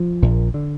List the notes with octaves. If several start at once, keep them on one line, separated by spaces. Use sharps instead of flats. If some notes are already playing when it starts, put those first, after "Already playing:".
Already playing: F3
A#1 A#2
D3